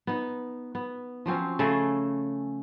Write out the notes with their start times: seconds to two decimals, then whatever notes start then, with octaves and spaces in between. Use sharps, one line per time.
0.07 B3 D#4
0.75 B3
1.26 F3 F#3 C4 C#4
1.59 C#3 A3 G#4 A4